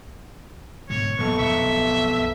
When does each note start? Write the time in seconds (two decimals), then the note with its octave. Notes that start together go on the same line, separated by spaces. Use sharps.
0.90 G#2 B2 D3 C#5
1.19 E2 A#2 F#3 B3 A4 C#6
1.39 B1 F2 E5